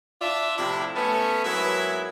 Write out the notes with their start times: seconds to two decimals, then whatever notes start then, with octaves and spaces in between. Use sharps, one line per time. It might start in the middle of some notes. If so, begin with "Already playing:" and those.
0.21 D4 F4 D5 E5
0.58 A2 C3 F3 D4 E4
0.96 A3 B3 C#4
1.45 G#2 F#3 A#3 B3 E4 E5